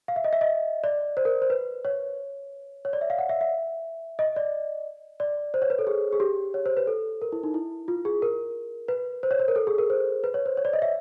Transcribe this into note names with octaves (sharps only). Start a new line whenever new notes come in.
F5
E5
D#5
E5
D#5
D5
C5
A#4
C5
B4
C#5
C#5
D5
E5
F5
F#5
E5
E5
D#5
D5
D5
C5
C#5
B4
A4
G#4
G#4
G4
C#5
C5
B4
A4
A#4
E4
D#4
E4
F4
G#4
A#4
B4
C5
C#5
C5
A#4
A4
G#4
A#4
C5
B4
C#5
C5
C#5
D5
D#5
E5